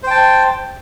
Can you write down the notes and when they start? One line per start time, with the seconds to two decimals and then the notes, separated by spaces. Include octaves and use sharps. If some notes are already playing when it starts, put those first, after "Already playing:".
0.03 C5
0.07 G5
0.11 A5